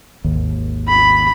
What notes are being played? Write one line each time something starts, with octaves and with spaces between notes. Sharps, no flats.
G#1 D#2
B5